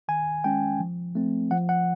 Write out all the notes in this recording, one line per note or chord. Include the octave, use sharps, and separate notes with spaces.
D#3 G#5
G#3 C#4 G5
F3
A3 C4
F3 F#5
F#5